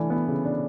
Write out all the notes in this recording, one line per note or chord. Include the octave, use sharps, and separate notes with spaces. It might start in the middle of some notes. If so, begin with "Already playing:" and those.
Already playing: E3 A3 D4
B3
C#3
D4